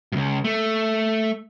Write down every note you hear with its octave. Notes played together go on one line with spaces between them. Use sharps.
C#2 G2
A3